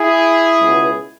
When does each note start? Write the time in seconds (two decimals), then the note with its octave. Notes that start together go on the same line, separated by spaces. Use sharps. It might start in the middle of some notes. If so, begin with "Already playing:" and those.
Already playing: E4 G#4
0.61 C#2 B2 B3